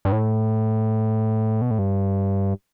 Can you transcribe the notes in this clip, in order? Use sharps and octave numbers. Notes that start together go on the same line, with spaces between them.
G2
A2
B2
A2
G2